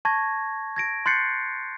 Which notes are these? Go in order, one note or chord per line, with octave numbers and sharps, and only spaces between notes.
A5 C#6 G#6 A#6
G#6 A#6 D7
C6 F#6 G6 A6 C7 C#7